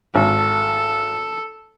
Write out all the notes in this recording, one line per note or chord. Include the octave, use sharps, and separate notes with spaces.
G#1 A4